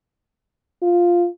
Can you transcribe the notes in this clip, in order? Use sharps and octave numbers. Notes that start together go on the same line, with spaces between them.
F4